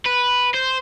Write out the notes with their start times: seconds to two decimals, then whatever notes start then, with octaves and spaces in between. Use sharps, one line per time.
0.06 B4
0.54 C5